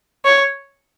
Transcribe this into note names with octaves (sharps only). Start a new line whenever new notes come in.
C#5